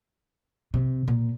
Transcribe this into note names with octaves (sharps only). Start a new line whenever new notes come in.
C3
A#2